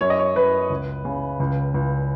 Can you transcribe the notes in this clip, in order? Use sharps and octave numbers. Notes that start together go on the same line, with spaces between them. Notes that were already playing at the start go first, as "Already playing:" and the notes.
F#2 C#5
D#5
C#5
F#2 B4
C#2
C#3
C#2
C#2